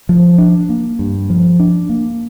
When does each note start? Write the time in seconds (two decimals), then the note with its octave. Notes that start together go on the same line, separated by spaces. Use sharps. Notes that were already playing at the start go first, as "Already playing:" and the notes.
0.09 F3
0.38 D4
0.69 A#3
0.99 G2
1.30 F3
1.60 D4
1.89 A#3